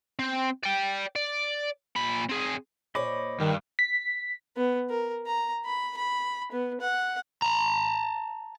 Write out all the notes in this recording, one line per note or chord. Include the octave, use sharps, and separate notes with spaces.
C4
D5 G5
D5
A#2 B5
C4 G#4
A#2 C5 C#5 D#5 B5 D6
G2 D#3
B6
B3
A#4
A#5
B5
B5
B3
F#5
A5 A#5